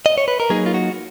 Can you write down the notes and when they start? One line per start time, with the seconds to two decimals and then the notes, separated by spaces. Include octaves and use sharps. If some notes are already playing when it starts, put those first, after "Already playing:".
0.06 D#5
0.18 C#5
0.28 B4
0.40 A#4
0.50 F#3 A#3 D#4 G#4
0.66 F4
0.74 F#4